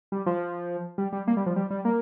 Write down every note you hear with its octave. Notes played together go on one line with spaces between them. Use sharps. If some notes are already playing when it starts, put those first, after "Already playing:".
G3
F3
G3
G3
A#3
G3
F3
G3
G3
A#3